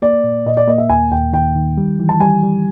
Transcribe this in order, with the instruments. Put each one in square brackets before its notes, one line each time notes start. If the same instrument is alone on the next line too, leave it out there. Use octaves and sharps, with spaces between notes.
[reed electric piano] A#3 [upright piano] D5
[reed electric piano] A#2
[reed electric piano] A#2 [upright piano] D#5
[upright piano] D5
[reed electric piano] A#3 [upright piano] D#5
[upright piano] E5
[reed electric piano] D#2 [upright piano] G#5
[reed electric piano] D#2 [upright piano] G5
[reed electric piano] D#3 [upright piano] G5
[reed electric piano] D#3
G3
E3
[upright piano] A5
[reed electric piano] G3 [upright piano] G#5
[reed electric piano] G3